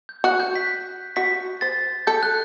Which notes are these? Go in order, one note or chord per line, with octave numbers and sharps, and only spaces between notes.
G6
F#4 F#6
G6
B6
F#4 B6
C5 A6
A4 G6
F#6